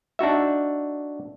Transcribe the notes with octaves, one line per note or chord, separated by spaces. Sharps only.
D4 D#4 F#4 E5